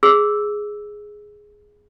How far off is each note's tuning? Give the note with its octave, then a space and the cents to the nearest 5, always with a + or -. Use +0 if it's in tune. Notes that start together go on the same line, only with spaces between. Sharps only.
G#4 +0 E6 +0